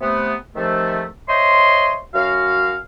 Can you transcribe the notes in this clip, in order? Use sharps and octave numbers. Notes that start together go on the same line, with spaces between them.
C3 A3 B3
C3 D#3 F3 A3
C5 C#5 D#5 E5 C6
F#2 F#4 F5